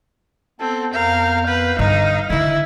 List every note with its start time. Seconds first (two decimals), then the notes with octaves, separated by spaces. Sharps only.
0.60 B3 C4 A4
0.93 F2 B3 A#4 F5 G6
1.48 B4 F5
1.79 G2 D3 D#4 D#5
2.30 D3 D#3 E4